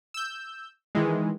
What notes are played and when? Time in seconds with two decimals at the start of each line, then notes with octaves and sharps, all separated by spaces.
0.14 E6 G6
0.95 D#3 E3 G#3